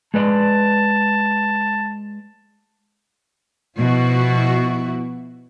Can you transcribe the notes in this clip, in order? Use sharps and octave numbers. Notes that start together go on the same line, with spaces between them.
G#3 B4 D5 A5
B2 F3 E4 F#4